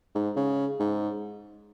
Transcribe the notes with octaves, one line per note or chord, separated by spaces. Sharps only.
G#2
C#3
G#2